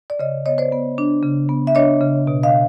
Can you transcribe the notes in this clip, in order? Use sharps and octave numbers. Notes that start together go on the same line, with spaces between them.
D5
C#3 C#5 D#5
B3 C#5 D#5
C5 D5
B3
D4
C#3
B3
E5
D4 C#5 D#5
C#3
B2
D#5 F5